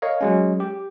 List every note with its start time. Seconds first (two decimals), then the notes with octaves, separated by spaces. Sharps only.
0.02 A#4 C#5 D#5 F5
0.21 F#3 G#3 C#4
0.60 G4